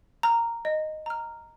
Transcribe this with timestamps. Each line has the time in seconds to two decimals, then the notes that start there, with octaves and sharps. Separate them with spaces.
0.23 A#5 F6
0.65 D#5
1.06 A#5 F6